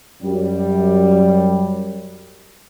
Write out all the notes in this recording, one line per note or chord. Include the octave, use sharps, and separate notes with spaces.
F#2 G3